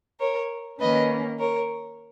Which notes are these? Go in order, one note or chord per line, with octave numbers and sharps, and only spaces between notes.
A#4 C#5
D#3 A#3 C#4 B4 D#5
A#4 C#5